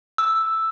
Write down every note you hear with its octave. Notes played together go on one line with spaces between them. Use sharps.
E6